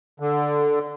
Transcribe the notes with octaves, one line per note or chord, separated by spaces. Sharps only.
D3